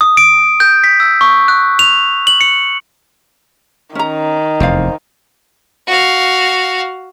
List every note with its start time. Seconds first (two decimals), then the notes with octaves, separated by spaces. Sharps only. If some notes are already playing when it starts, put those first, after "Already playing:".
0.01 D#6
0.17 D7
0.60 G6
0.84 B6
1.00 E6
1.21 C#6
1.48 F#6
1.79 F7
2.27 F#7
2.41 C#7
3.95 D#3 C#4 A#5
4.60 F1 E2 C5 D5 F5
5.87 F#4 F5